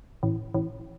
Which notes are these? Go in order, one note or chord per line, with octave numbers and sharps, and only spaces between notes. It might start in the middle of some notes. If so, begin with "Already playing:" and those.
A1
A1